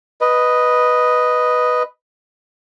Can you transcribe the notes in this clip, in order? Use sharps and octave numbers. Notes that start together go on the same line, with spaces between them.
B4 D#5